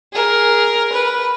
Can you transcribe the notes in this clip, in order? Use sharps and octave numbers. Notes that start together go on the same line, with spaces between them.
G#4 A#4
B4